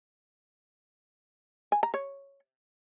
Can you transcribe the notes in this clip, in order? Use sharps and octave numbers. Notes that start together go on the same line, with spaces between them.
G#5
A#5
C#5